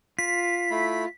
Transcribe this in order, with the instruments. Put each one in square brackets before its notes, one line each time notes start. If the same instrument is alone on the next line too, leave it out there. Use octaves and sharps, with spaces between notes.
[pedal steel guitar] F4 [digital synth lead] B6
[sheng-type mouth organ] A3 E4 B5